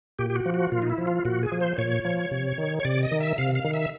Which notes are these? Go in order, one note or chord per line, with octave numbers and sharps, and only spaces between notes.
A#2 G4
G4
F#4
F3
F#4
A#2 F4
D#4
E4
F3
F4
A#2 F#4
G#4
F3
C5
A#2 C#5
F3
C3
D#3
C#5
C3 D5
D#5
D#3
E5
C3 F5
F5
D#3
E5